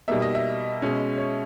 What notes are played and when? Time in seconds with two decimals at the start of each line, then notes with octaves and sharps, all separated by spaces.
0.08 B2 G3 A#3 D#4 E5
0.22 D#5
0.35 E5
0.82 B2 G#3 C#4
1.18 C#5